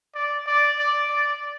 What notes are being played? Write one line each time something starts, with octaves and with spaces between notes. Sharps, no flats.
D5
D5
D5
D5